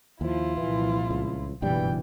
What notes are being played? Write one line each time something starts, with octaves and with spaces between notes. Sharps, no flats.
D#2 F3 E4 F4
C2 A#2 E3 F3
C#2
F#1 G2 B2 E3 G3 G5